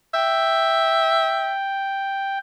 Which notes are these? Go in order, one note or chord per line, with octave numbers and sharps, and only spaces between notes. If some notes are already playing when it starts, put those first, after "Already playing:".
E5 G5